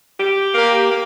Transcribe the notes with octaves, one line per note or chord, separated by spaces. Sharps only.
G4
A#3
A#3